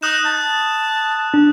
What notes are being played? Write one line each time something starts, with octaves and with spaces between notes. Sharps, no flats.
D#4 D#6 F#6 E7
A5
D4